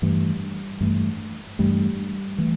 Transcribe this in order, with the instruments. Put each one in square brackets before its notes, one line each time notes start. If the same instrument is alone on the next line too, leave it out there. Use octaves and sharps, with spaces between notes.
[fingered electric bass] G2 E3 A3 [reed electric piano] G3
[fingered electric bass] G2 E3 A3
[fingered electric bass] G2 E3 A3 [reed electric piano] G3
[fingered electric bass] E3 A3